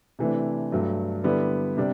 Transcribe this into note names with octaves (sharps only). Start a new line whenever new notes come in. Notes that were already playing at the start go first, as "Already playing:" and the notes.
C3 E3 A3 D4
G2 F#3 A3
D3 G3 B3 E4
C3 G3 D4